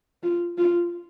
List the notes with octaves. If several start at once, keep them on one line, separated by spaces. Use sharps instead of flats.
F4
F4